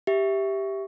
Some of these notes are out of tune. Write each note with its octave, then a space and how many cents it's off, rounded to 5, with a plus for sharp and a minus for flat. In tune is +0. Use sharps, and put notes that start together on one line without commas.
G4 +0 E5 +0